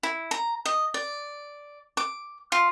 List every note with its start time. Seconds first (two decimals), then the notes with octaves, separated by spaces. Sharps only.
0.03 E4
0.31 A#5
0.65 D#5
0.94 D5
1.97 D6
2.52 F4